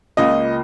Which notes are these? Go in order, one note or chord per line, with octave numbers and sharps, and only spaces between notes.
C#2 C#3 A#3 F4 D#5